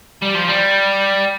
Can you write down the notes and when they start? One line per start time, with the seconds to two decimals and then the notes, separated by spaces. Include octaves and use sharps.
0.22 G3
0.35 F3
0.48 G3